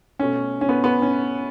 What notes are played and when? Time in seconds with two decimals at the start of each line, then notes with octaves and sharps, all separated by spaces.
0.19 B2 A3 C#4
0.61 C#4
0.69 B3
0.84 B3
1.02 C#4